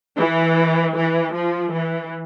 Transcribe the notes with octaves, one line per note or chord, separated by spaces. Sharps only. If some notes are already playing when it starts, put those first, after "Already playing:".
E3
E3
F3
E3